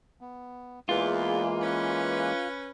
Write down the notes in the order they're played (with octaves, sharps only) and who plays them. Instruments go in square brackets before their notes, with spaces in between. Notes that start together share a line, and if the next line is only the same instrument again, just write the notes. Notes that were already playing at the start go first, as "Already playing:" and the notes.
[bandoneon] B3
[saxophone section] E2 [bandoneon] E3 G#3 A#3 [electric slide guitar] F4
[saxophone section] C#4 B4